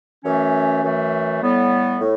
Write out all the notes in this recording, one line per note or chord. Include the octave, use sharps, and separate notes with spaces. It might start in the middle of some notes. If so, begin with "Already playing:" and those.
F#2 E3 A3 C#4
F#2 E3 A3
A2 G3 B3
A2